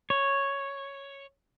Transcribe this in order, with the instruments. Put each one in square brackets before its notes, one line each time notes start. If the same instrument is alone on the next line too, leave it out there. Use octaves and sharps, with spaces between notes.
[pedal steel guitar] C#5